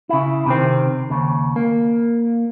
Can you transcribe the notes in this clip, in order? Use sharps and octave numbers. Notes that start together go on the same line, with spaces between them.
C#3 E4
C3 D#3 C4
D#2 C#3
A#3